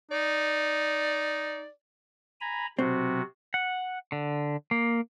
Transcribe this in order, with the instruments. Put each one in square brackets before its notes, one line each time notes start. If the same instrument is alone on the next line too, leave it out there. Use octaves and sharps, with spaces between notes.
[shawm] D#4 [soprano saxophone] D5
[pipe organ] G#5 A#5 B5
[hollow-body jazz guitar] B1 C4 [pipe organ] C3 F#4
[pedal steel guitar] F#5
D3
A#3